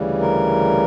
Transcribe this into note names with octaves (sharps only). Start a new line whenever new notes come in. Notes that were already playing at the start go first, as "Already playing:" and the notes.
Already playing: D2 C#3 E3 G3
A#4